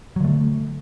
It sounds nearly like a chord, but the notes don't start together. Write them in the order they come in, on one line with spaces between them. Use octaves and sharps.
F#3 D3 A3